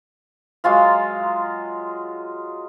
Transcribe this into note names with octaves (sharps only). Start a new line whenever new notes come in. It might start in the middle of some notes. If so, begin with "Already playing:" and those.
F#3 G#3 F4 F5